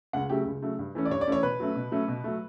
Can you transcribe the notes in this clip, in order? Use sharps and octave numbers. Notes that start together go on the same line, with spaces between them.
C#2 F#5
C#3 F#3 A3 G4
C#2
C#3 F#3 A3
G2
E3 A3 C#4
D5
G2 C#5
D5
E3 A3 C#4 C#5
B2 B4
F#3 A3 C#4
B2
F#3 A3 C#4
B2
F#3 A3